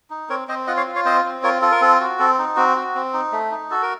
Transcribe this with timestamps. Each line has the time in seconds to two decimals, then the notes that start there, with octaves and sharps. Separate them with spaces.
0.10 D#4
0.29 C4 A#4 C#5
0.48 C4 C5 D#5
0.67 F4 D#5 F#5
0.77 C#5 F5
0.87 F4
0.95 C#5 F5
1.05 C4 C5 D#5
1.24 C4
1.43 F4 A#4 C#5
1.62 F4 A4
1.72 A#4
1.81 C4 A4
2.00 F#4
2.19 C4 A4
2.39 D#4
2.56 C4 F#4
2.76 F#4
2.95 C4
3.14 D#4
3.32 A3
3.52 D#4
3.71 F#4 A4
3.82 A#4